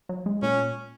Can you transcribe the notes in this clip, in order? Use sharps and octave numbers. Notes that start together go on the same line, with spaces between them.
F#3
G#3
A#2 C#4